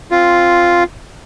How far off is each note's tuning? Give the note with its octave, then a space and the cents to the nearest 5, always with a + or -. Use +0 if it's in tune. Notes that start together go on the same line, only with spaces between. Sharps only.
C4 +5 F4 +0